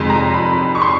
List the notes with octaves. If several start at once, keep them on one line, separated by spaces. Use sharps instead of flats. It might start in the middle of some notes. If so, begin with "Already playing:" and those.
Already playing: F2 C3 D#3 G#3 C6
A#5
B5
C#6
C6